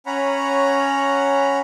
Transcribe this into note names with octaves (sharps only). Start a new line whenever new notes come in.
C#4 C#5 F#5 A#5 B5